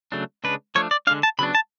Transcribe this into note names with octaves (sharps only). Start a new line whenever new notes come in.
C#3 F#3 A3 D4
C#3 G#3 D4 B4
F3 A3 D4 C#5
D5
D3 G#3 D4 F5
A5
C#3 F#3 B3 D4 B5
A5